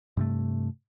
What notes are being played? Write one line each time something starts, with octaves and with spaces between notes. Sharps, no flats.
G2 C3 A3